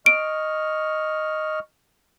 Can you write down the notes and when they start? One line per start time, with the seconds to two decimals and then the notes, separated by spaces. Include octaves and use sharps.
0.06 D#5 C#6 F6 D7